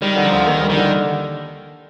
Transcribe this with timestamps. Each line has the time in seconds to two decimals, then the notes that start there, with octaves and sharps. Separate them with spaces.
0.01 D#3 G3
0.16 D3
0.25 F3
0.32 D2
0.47 D#3 A#3
0.62 G3
0.70 D#3
0.77 D3